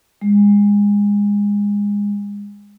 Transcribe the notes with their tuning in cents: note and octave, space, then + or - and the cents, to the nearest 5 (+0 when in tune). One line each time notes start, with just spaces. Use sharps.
G#3 -25